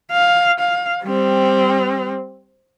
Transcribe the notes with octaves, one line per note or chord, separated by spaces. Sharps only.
F5
F5
G3 C4